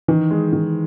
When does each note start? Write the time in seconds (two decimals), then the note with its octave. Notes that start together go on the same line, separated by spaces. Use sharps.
0.08 D#3 E3
0.31 G#3
0.53 D#3